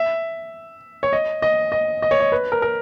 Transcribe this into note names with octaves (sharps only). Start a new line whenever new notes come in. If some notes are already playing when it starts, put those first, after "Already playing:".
Already playing: E5
C#5
D#5
D#5
D#5
D#5
C#5
D#5
B4
A#4
A#4